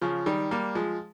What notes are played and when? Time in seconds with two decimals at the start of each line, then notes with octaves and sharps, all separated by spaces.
0.01 C#3 F3
0.26 D#3 G3
0.51 G3 A#3
0.75 F3 G#3